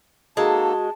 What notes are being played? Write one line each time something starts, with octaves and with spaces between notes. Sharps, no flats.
G#3 A#3 D#4 F#4 A4 A5